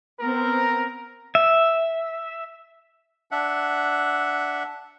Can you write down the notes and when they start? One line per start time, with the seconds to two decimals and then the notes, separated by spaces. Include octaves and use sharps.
0.20 B3 C4 A#4
1.35 E5
3.31 D4 E5 F#5